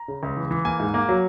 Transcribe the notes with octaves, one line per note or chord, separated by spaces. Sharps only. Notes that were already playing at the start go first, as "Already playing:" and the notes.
Already playing: A#5
C#3
C#2
E3
E3
A#3 G#5
G#2
A#3
F#3